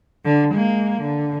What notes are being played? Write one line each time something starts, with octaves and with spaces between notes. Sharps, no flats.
D3
G#3 A#3
D3